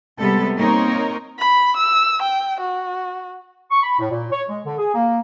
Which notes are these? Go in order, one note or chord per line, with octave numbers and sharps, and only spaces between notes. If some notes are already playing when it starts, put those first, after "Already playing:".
C3 G3 G#3 B3 A4
A#3 C4 D#4 A#4 C#5
B5
E6
G5
F#4
C#6
B5
A2
A#2
C#5
G#3
D3
G#4
A#3